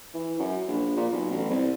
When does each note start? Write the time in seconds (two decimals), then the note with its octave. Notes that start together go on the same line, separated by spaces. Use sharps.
0.14 E3
0.39 F#2
0.68 A#1
0.97 A#2
1.12 B1
1.31 A1
1.50 C2